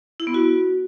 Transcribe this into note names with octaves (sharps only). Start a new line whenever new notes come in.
E4
B3
F#4